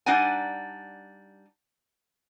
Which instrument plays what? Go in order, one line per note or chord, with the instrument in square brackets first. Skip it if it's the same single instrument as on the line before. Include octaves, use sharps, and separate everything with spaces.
[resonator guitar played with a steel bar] G3 D4 D#4 D5 F#5 G#5